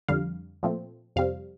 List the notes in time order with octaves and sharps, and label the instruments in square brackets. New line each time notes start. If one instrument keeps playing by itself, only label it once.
[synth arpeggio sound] F2 D3 G3 F5
A#2 F3 A3 C4
F2 C3 G3 C4 F5